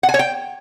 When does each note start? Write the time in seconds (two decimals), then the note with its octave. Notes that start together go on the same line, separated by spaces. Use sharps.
0.03 F#5
0.09 G#5
0.14 C#5
0.19 G5